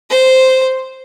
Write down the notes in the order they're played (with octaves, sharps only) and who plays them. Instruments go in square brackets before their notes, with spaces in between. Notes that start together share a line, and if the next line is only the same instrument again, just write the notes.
[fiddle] C5